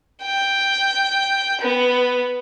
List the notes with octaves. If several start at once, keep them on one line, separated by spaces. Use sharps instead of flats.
G5
B3